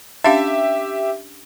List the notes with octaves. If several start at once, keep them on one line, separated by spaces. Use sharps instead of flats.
C#4 D4 G4 E5 F5